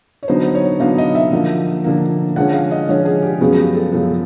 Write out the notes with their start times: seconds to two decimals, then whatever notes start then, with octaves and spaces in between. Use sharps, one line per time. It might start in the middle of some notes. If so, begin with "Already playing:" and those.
0.23 C#5
0.28 D3 F#3 B3 D#4 C5
0.55 C#5
0.80 D3 F#3 B3 D#4 F5
0.98 D#5
1.15 E5
1.32 D3 F3 A#3
1.84 D3 F3 A#3
2.36 D3 F3 G#3 C#4 F#5
2.53 F5
2.71 D#5
2.89 D3 F3 G#3 C#4 C#5
3.05 G#4
3.22 G4
3.41 F#2 C#3 F3 G#3 B3 F#4
3.58 G4
3.75 A4
3.92 F#2 C#3 F3 G#3 B3